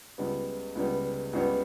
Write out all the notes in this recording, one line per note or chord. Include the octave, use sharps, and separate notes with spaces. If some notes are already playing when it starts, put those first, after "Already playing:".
C#2 C#3 G3 B3
C#2 C#3 G3 B3
C#2 C#3 G3 B3